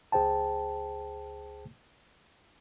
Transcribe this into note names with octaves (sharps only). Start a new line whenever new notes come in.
C#2 G#4 C5 G5 A5